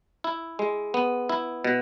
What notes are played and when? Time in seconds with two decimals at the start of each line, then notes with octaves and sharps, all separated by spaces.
0.24 E4
0.59 G#3
0.94 B3
1.29 E4
1.65 B2